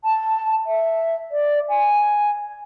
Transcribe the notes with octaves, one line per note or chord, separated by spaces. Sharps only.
A5
E5
D5
G#5